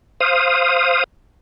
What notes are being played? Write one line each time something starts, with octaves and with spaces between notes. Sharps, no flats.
C5 F5 D#6